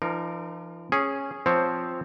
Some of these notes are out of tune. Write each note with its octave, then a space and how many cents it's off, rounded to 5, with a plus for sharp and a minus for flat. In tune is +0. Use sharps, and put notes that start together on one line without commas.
F3 -45 D#4 -40 A#4 +0
C#4 -10 G#4 +0
F3 +0 C4 +0 C#5 +5